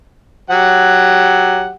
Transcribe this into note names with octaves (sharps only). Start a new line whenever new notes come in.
F#3 G4 F#5